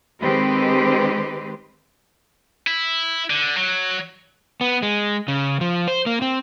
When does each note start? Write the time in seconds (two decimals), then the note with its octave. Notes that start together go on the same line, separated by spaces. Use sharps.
0.20 D#3 G#3 C4 G4 B4 C5
2.67 E4
3.30 D3
3.57 F#3
4.61 B3
4.82 G#3
5.28 C#3
5.61 F3
5.88 C5
6.06 A#3
6.22 C4